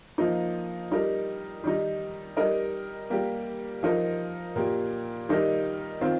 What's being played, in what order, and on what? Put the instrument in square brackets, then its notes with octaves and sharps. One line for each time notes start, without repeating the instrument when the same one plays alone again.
[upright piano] F3 A#3 D#4
G3 D#4 A#4
D#3 G3 D#4
G3 D#4 A#4 D#5
G3 A#3 G4
F3 D#4 A#4
A#2 A#3 G4
D#3 G3 D#4 A#4 D#5
D#3 C4 F4